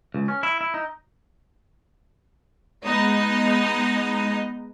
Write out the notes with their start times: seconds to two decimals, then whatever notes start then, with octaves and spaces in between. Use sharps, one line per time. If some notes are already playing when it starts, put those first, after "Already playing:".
0.14 C#2
0.28 C#4
0.43 E4
0.61 E4
0.74 D#4
2.85 G#3 B3 D#4 D#5